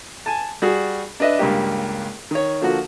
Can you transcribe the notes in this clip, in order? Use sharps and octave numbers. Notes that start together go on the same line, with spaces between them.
G#5 A5
G3 F#4 G#4
D4 B4 D#5 E5
C#2 G2 A#3 G4
D#3 C#5
D3 F3 A#3 F#4